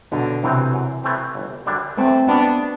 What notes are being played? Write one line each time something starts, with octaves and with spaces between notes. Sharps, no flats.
B1 B2 D3
A2 C3 E3 F#3 C4
F#2
E3 A3 C4
G1
F#2 D3 G3 D4
E2 A3 C4
B2 G3 B3 D4